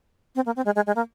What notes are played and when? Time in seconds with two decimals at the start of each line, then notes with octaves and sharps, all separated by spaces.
0.35 C4
0.46 A#3
0.56 C4
0.65 G#3
0.76 G#3
0.87 G#3
0.96 A#3